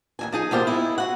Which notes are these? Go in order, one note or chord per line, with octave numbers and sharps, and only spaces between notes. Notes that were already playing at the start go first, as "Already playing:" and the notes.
D#2 E3 G#5
F3 D#4 G#4
E2 B2 A#3 F4 G4 C5
G#3 E4
F#4 F#5